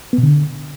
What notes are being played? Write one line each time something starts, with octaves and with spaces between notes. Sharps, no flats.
B3
B2
D3